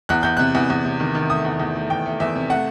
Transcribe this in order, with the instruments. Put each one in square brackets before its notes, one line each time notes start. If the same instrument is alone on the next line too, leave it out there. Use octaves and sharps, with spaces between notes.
[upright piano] E2 F#6
E2 G6
C3 F#6
E2
E2
C3
D#3
D#3
A3 D#6
E2
E2
A3
E2 G5
A3
E2 E5
C3
A3 F#5